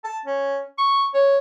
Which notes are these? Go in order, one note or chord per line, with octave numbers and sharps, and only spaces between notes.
A5
C#4
C#6
C#5